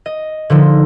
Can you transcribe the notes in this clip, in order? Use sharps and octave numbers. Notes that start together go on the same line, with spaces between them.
D#5
D3 F3 D#4